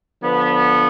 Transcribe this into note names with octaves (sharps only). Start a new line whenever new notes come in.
D3 F3 B3